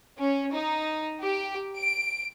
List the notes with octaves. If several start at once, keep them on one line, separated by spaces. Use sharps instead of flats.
C#4
D#4
G4
D7